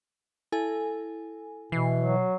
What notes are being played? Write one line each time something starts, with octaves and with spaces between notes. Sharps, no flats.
E4 A4 G#5
B2 E3 C7
F#3